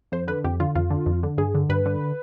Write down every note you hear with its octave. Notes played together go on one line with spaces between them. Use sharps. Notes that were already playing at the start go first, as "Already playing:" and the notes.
F2 C5
D3 B4
F2 G4
D3 F4
F2 F4
D3
F2
D3
G2 G#4
D3
G2 B4
D3